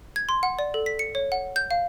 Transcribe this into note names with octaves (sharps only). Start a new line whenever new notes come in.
G#6
C6
F#5
D5
A4
B6
C#7
C#5
F#5
G6
F5